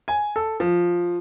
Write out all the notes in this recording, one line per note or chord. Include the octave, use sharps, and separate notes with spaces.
G#5
A4
F3